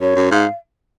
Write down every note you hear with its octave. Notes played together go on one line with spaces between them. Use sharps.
F#2 C#5
F#2
G#2 F5